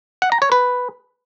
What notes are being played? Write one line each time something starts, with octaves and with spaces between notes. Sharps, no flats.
F#5
A#5
C#5
B4